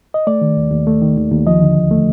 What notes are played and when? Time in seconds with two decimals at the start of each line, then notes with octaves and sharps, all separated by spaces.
0.14 D#5
0.27 A3 D5
0.41 D#3
0.57 D#2
0.72 D#2
0.87 A3
1.02 D#3
1.17 D#2
1.32 D#2
1.47 F3 D#5
1.62 D3
1.77 D2
1.91 A3